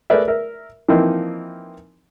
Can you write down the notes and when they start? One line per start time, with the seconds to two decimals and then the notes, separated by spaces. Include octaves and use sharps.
0.10 A3 G#4 A#4 B4 D5 E5
0.28 A#4 E5
0.88 E3 F3 A#3 C4 D#4